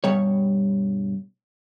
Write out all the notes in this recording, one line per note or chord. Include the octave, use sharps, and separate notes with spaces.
G2 B2 G3 C#5